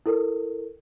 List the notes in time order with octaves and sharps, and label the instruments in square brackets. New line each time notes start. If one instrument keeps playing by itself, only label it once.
[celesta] E4 A4 A#4